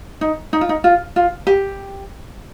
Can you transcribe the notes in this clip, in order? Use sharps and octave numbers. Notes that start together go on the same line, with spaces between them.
D#4
D#4
F4
D#4
F4
F4
G4